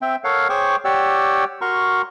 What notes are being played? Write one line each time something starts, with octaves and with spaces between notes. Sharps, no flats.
C4 E5 G5
A4 A#4 C#5 F5 F#5
G#4 C5 C#5 G5 C#6 D6
G4 C#5 D5 F#5 G5 E6
F#4 A#4 A#5 C6 C#6